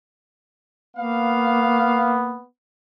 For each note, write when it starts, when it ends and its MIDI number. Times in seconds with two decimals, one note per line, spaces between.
0.96 2.40 58
0.96 2.47 59
0.96 2.14 77